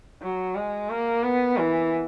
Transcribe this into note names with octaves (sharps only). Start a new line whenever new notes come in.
F#3
G#3
A#3
B3
E3